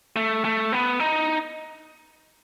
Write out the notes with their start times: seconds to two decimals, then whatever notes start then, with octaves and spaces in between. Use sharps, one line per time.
0.16 A3
0.45 A3
0.72 B3
1.00 D#4